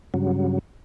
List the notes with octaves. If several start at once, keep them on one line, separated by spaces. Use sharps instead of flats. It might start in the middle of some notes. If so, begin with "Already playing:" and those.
G2 C#3 F#3